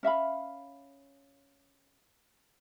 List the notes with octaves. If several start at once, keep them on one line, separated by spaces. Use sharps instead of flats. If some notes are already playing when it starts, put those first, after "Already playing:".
C#4 E5 F5 B5